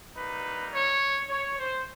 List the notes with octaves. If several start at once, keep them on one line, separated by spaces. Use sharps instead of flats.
G3 A#3 D#4 B4
C#5
C#5
C5